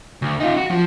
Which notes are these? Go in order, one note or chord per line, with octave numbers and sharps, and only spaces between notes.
D2
D#4 F4
F#4
F3